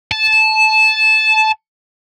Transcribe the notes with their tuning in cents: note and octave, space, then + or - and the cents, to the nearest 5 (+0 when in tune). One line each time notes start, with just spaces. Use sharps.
A5 -15